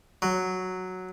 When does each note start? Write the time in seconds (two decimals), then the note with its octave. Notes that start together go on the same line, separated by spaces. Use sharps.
0.22 F#3